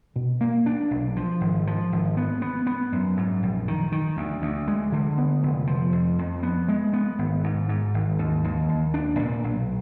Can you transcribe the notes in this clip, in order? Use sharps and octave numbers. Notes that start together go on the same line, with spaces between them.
B2
A#3
D4
B1
F3
G#1
F3
G#1
B3
B3
B3
F#2
G#2
A#1
D#3
D#3
D2
D2
G#3
D3
B3
F1
F3
F2
F2
B3
G#3
B3
G#1
G#2
G#2
G#1
D#2
D#2
D#2
D4
A#2
B1